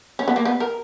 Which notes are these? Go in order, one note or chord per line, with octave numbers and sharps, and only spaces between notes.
C#4
B3
A#3
B3
A#4